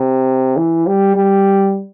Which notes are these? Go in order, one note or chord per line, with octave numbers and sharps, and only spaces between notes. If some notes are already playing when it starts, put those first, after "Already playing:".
Already playing: C3
E3
G3
G3